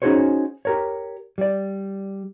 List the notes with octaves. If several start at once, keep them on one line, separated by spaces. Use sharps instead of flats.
C#4 D#4 F#4 G#4 C5 C#5
G4 A#4 C#5
G3 D5